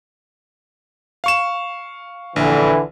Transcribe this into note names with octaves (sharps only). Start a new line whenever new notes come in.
F5 C#6 E7
A#1 D3 E3